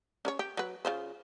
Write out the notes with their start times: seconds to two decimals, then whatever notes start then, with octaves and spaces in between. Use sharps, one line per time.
0.25 C#4 A#4 C#5
0.39 G4
0.57 F#3 B4
0.85 C#3 F4 C5